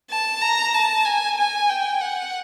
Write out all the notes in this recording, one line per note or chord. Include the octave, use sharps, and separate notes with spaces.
A5
A#5
A5
G#5
G#5
G5
F#5